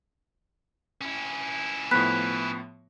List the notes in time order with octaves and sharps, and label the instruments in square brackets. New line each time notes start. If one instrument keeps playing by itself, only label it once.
[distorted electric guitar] C#4 E4
[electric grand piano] A2 F3 B3 [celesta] B5 F#6 B6